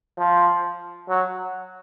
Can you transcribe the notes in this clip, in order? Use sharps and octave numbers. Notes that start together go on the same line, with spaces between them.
F3
F#3